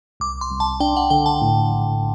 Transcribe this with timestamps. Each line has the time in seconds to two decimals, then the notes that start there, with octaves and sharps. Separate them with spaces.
0.20 C2 D6
0.41 C6
0.51 C2
0.60 A5
0.80 D4 G5
0.96 F#5
1.10 D3 G5
1.26 A5
1.41 A2
1.70 A#1